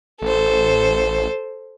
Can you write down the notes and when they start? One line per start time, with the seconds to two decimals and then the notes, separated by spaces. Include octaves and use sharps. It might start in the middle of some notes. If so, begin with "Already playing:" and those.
0.22 A1 A4 C5